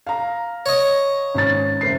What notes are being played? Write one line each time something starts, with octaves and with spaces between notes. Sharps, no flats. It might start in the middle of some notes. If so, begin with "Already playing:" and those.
F5 A#5
C#5 D#5
G#1 C#4 A6
F#1 C5 C7